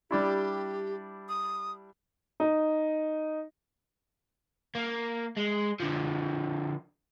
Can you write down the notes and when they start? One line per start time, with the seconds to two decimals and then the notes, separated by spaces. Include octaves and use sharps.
0.11 G3 D4 E4 G4
1.29 D#6
2.40 D#4
4.75 A#3
5.37 G#3
5.80 D3 F3